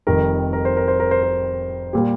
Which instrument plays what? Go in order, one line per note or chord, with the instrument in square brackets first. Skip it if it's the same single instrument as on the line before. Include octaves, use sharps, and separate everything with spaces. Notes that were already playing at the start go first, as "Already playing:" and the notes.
[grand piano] F1 F2 D#3 G3 A#4
A#4
C5
A#4
C5
A#4
C5
A#4
A#2 G3 G4